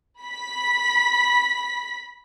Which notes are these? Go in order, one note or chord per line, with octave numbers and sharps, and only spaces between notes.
B5 B6